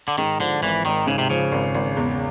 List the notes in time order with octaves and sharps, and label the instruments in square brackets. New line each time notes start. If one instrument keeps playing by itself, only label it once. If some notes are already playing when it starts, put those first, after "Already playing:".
[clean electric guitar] D3
[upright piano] G#2 [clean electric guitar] D#3
[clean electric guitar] D3 [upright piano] F3
[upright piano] G#1 [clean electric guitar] E3
[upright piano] G#1 [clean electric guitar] D#3
[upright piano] G#2 [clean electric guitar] C#3
[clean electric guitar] C3
[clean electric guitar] C#3 [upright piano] F3
[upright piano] G#1
G#1
E2